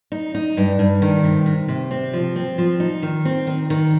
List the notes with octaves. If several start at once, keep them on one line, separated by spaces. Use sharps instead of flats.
D#4
D#4
G2
G2
D#3
C3
C3
C3
C4
F3
C4
F3
D#4
D#3
C4
D#3
D#3